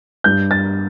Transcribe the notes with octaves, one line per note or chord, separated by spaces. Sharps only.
G2 G6
A6